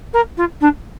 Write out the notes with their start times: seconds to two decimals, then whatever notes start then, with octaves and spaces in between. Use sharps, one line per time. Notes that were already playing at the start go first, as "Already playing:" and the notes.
0.13 A#4
0.37 F4
0.61 D4